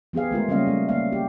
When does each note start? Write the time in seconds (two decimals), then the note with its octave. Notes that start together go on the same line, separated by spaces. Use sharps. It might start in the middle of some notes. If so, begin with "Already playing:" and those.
0.13 F3 B3 G4 G#4 F5
0.31 G#3 A3 F4 A#4
0.48 C#3 G3 A#3 C#4 D#5 F5
0.67 G3 A3
0.89 A#3 F5
1.12 G4